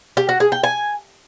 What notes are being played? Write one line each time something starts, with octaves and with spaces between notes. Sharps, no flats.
G4
F#4
G#4
G5
G#5